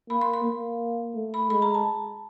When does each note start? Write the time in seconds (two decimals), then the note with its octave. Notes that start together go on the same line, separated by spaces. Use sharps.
0.10 A#3 B5
0.21 C6
0.34 C6
0.44 A#3
1.15 A3
1.34 B5
1.50 G#3 B5
1.62 A#5
1.74 A5